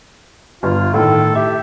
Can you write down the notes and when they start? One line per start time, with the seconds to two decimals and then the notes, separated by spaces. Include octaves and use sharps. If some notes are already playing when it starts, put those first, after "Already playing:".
0.63 G1 F4
0.94 A2 D#3 A4
1.35 G4 E5